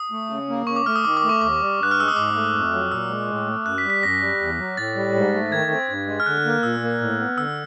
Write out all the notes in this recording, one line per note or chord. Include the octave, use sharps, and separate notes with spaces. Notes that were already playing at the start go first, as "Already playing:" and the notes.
Already playing: D#6
A3
C#3
A#3
C#3 C#6
D6
A3 F6
D#6
D#3 D6
D6
A3
C#6
D#2 D6
G3
G2 F#6
F6
G#3 E6
D#6
G#2 D6
A3
F2
F#3
A#2 E6
G#3
A2
A3
F#2 F#6
B6
G3
B6
F#2 A#6
G3
E2
F#3
A2 A6
G3
G#2
A3
D#3 G#6
C4
G2
G#3
F6
D3 F#6
F#6
A#3
F6
A#2 E6
A#3
A2
B3
D3 E6